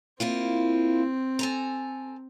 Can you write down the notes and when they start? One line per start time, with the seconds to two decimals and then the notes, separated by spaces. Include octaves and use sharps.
0.20 A#3 C4 E4 F4
1.39 A4 G#5 A#5